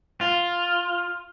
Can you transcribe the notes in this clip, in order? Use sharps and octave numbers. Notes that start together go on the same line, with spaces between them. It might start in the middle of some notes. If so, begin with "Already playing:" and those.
F4